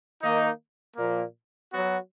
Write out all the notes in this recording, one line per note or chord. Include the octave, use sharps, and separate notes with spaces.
D#3 A#3 D#4
A#2 F3 A#3
F#3 B3 F#4